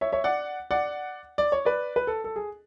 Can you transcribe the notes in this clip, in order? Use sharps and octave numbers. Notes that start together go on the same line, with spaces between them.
C#5 E5
C#5 E5
D5 F#5
D5 F#5
D5
C#5
B4 D5
B4
A4
A4
G#4